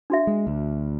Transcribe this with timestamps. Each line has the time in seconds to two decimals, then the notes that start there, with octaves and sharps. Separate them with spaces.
0.10 D4 F#4 E5
0.27 G#3
0.47 D2